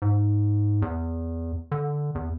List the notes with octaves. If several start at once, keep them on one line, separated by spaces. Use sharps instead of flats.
G#2
E2
D3
E2